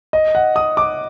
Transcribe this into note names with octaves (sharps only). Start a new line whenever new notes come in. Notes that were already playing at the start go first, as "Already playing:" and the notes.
D#5
F#5
D#6
D6